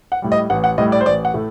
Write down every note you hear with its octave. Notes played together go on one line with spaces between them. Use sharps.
F#5
A2 G3
D#5
A1 F#5
F#5
A2 G3 D#5
D5
C5
A1 D5
F#5
A2 A3